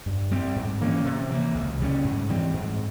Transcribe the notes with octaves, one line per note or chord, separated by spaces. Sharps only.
G2
G3 C4
G#2
E3 A#3 C#4
C3
E3 A#3
C#2
C#3 G3 C#4
G#2
E3 G3 C4
G#2